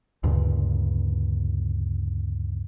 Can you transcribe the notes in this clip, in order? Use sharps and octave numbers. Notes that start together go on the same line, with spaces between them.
D2 G2 A#2 C#3